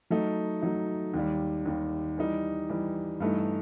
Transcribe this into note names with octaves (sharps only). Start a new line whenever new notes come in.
F#3 A3 D#4
F#3 A3 D#4
D#2 D#3 G3
D#2 D#3 G3
E3 G3 D#4
E3 G3 D#4
G2 E3 A3 D#4